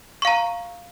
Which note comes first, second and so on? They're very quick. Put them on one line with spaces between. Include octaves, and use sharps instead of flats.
C#6 F5 A#5